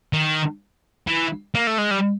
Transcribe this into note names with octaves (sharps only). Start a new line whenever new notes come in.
D#3
E3
A#3
A3
G#3
G3